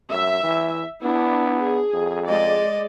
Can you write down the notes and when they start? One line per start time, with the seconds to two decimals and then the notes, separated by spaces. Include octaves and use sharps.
0.11 F#2 E5
0.43 E3
1.03 B3 D4 E4
1.61 G#4
1.94 F2
2.29 G#3 D5 D#5